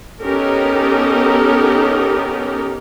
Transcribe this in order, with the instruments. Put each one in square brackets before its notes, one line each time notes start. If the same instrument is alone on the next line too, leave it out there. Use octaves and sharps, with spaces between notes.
[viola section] B3 C#4 D#4 G4 A4 A#4